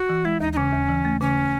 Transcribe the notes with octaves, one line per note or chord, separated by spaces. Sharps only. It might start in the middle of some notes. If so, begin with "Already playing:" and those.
Already playing: F#4
E3
G#3 E4
D#2 D#4
D#4
C#3 C#4
D#2
E3
A3
C#3 C#4